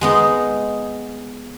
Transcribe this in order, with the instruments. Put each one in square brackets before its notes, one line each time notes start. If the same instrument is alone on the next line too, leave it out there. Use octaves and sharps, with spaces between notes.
[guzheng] G#3 B3 D#4